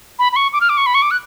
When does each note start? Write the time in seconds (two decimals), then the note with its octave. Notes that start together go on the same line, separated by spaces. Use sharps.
0.19 B5
0.32 B5
0.36 C#6
0.53 D6
0.61 F6
0.69 D6
0.77 C#6
0.86 B5
0.95 C#6
1.02 D6
1.11 F#6